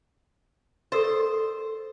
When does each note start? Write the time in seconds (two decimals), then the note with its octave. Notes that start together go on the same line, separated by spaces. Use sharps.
0.92 A4 A#4 C5 D#5